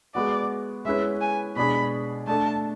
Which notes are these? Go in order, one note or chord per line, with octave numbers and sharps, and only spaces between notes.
G#3 B3 F#4 D5
G#3 C#4 E4 B4 E5
G#5
B2 G#3 D4 G#4 B5
A3 D4 A4 A5